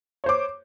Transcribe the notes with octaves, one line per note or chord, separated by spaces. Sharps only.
C5 C#5 D6